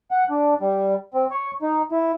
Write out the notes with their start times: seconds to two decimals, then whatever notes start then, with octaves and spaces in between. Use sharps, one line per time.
0.11 F#5
0.30 D4
0.61 G3
1.14 C4
1.31 C#5
1.62 D#4
1.92 E4